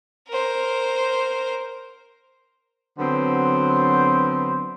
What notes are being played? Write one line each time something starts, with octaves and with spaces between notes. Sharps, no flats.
A#4 C5
D3 F#3 B3 C4 C5